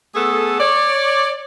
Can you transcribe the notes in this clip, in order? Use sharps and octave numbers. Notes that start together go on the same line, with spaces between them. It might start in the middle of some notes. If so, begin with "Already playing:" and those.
A3 B3 G#4 A4
C#5 D5